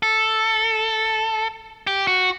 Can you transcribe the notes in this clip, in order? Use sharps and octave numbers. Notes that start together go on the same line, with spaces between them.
A4
G4
F#4